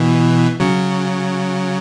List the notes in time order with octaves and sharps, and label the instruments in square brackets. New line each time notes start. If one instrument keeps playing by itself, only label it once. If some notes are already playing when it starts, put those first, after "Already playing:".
Already playing: [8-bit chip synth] B2 E3
C#3 F#3